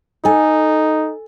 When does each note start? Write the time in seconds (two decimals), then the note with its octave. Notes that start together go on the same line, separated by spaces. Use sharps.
0.25 D#4 A4 G#5